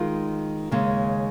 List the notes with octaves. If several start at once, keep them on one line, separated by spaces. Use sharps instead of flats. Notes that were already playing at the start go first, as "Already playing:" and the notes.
Already playing: D#3 G#3 F4
D#2 C#3 G#3